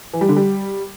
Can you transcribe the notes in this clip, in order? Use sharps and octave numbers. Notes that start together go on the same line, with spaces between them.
E3
G3
D3
G3